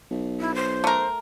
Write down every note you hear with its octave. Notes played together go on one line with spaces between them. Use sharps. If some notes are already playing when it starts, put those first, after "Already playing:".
B1
E4
C5
A3 A#4